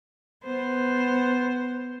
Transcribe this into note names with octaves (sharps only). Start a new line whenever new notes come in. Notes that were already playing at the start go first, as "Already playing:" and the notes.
B3 C5